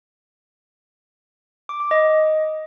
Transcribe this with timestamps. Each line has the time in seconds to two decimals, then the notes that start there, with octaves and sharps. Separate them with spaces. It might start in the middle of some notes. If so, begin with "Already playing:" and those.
1.69 D6
1.80 D6
1.91 D#5